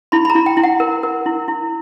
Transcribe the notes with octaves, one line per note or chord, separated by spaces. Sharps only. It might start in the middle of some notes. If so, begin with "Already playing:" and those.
E4 B5
B5
A#5
E4
G5
E4
F#5
A#4
A#4
E4
E4